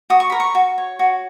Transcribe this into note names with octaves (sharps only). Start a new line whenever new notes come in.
F#4 D#6
C#6
A#4 B5
C#6
F#4
C#5
F#4